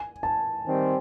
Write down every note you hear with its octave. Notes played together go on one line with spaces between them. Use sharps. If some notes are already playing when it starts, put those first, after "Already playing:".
Already playing: G#5
A5
D#3 G3 C4